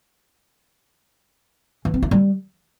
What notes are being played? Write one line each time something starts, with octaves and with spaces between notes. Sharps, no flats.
E3
C4
E4
G3